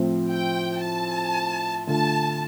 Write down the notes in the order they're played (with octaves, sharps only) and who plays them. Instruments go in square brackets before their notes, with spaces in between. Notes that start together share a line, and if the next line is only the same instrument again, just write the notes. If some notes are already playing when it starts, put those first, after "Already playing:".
Already playing: [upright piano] A2 F3 C4
[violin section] G5
A5
[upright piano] D3 A3 F4 [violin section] A5